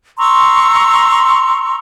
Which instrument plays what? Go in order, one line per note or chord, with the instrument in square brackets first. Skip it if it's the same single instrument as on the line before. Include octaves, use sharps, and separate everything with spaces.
[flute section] A#5 C6 C#6 E6